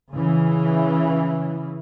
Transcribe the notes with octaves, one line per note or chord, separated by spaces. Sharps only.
C#3 E3